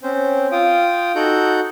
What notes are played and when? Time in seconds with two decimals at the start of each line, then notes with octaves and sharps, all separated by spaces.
0.03 C4 C#4 C5
0.52 F4 F5 G5 D#6
1.15 D#4 F#4 A4 F#5 G6